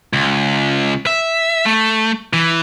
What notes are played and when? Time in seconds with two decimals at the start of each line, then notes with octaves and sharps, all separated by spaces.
0.13 C#2
1.06 E5
1.66 A3
2.33 E3